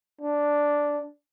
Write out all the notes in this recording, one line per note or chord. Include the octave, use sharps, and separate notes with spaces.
D4